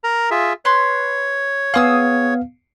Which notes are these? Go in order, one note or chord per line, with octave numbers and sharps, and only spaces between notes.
A#4 A#5
F4 G#4 E5
B4 C#5 C6
B3 G#4 F5 D#6 E6